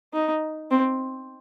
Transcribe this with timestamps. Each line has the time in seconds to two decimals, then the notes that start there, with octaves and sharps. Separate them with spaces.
0.13 D#4
0.71 C4